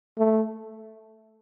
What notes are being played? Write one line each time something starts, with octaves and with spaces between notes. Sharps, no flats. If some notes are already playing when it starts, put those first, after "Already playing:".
A3